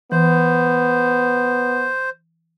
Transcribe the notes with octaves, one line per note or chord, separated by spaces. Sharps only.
E3 B3 C5